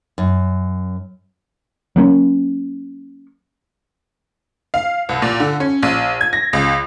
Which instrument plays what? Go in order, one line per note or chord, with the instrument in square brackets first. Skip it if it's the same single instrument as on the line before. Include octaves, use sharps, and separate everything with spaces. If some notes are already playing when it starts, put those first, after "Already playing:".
[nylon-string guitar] F#2
[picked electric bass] F#3 A#3 C4 C#4
[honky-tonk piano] F5
C2
A#2
D3
C#4
A#1
G#6
A#6
C#2